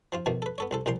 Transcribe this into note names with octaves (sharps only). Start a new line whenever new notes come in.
F3 C4 F4
B2 D#3 F3 A3 A#3
A4 B4
B3 A4 C#5
C2 C4 A4
C2 A#2 F3 G5 A#5 C6